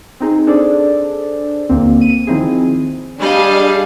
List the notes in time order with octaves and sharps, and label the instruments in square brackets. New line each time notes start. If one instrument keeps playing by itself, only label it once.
[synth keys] C4 D#4 G#4
D4 G#4 A4 C5 D5
D2 A#3 C4
D#7
D#3 F3 C4 D#4 E4 G#4
[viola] G3 D#5 [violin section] D4 G#4 F5